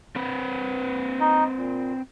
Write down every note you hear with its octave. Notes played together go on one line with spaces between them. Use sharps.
C4 B4
D#4 D#5
A#2